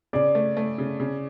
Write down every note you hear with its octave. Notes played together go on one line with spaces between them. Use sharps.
C#3 D5
A3
A3
C#3
C#3